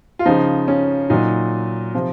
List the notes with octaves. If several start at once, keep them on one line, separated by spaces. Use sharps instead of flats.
F4
C#3 F3 D#4
C#4
A#2 F#3 D#4
C3 F3